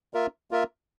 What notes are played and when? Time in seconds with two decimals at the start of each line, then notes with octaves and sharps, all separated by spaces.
0.14 A#3 F4 A#4 E5
0.51 A#3 F4 A#4 E5